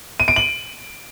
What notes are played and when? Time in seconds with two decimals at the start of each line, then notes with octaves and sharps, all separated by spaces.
0.20 D#7
0.28 D7
0.36 F#7